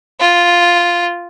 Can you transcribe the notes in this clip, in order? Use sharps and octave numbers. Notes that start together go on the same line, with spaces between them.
F4